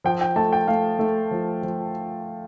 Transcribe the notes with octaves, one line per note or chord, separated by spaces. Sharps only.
F3 G5
G5
A3 A5
G5
A3 F5
A3
F3
F3